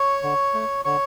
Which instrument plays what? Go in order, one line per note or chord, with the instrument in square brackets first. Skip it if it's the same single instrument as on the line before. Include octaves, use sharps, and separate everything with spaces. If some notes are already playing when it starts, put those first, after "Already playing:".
Already playing: [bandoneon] C#5 C#6
D3
A3
D3 C#5 C#6